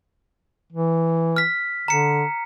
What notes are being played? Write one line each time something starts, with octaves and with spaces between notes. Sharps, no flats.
E3
F6 B6
D3 A#5 C#7